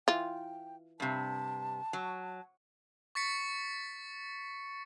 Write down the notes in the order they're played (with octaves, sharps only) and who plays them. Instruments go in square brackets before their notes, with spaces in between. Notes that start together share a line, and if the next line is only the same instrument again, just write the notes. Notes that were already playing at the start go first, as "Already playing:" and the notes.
[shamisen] E3 F4 [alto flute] G5
[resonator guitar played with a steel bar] G2 C3 [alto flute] A5
[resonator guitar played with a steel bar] F#3
[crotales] C#6 A6 B6 C#7